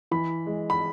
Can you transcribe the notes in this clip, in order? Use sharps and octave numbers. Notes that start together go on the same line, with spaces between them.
E3 B5
G#3
B5